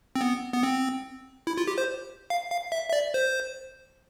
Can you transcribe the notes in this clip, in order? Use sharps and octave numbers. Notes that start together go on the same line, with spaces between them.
C4
B3
B3
C4
E4
F4
G4
C5
F5
F5
E5
E5
D5
C5